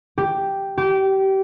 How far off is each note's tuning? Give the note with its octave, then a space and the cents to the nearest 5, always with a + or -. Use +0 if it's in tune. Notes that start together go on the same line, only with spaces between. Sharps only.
G4 +0
G4 -25